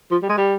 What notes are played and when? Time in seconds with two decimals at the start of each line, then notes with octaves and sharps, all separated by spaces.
0.11 F3
0.22 G3
0.29 G#3
0.38 G3